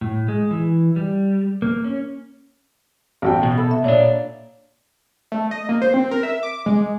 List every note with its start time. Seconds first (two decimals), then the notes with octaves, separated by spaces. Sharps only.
0.01 A2
0.28 G#3
0.51 E3
0.96 G3
1.62 A#3
1.84 C#4
3.22 A1 F#4 G5
3.43 B2
3.58 A4 B5
3.71 E5
3.84 A#2 D4 C#5 D5
5.32 A3
5.51 D#5
5.69 A#3
5.82 C5
5.94 C4
6.11 A#4
6.23 E5
6.43 D6
6.66 G#3